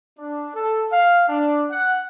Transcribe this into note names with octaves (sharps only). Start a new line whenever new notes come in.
D4
A4
F5
D4
F#5